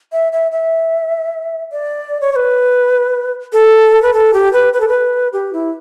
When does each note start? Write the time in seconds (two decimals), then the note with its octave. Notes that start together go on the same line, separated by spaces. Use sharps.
0.12 E5
0.32 E5
0.52 E5
1.72 D5
2.21 C#5
2.32 C#5
2.36 B4
3.53 A4
4.02 B4
4.13 A4
4.33 G4
4.53 B4
4.73 B4
4.80 A4
4.88 B4
5.33 G4
5.53 E4